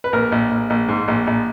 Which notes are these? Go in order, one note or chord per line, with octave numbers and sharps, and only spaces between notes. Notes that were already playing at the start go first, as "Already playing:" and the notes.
B4
A#1 A#4
A#1
A#1
A#1
G#2
A#1
A#1